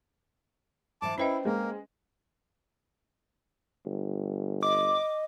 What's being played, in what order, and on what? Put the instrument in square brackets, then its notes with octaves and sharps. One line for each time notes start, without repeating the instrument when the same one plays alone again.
[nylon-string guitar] G#2 E3 G#3 [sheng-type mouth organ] A5 D6
[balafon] C#4 B4 D#5 [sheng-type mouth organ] E4 [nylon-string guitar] C5 G5
[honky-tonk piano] G#3 [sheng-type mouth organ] A#3
[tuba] G1
[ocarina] D#5 [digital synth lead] D6